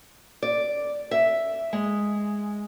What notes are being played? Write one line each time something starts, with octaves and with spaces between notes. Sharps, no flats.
D5
E5
G#3